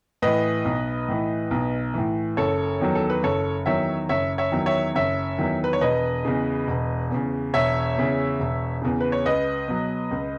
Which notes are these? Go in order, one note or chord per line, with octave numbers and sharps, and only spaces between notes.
A2 E3 B4 D#5
B1
A2 E3
B1
A2 E3
F#1 A4 C#5
E2 D#3 F#3
A4
B4
F#1 A4 C#5
E2 D#3 F#3 C#5 E5
F#1 C#5 E5
C#5 E5
E2 D#3 F#3
C#5 E5
F#1 C#5 E5
E2 D#3 F#3
B4
C#5
E1 B4 D#5
E2 C#3
E1
E2 C#3
E1 C#5 E5
E2 C#3
E1
E2 C#3
B4
C#5
C#2 B4 D#5
B2 F#3
C#2